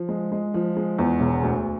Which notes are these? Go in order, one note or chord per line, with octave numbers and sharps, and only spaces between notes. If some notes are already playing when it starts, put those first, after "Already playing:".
Already playing: F3
G#3
G#3
F3
G#3
E2
E1
D2